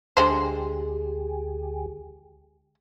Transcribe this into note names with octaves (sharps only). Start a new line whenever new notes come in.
D2 D3 G#3 G4 G#4 C5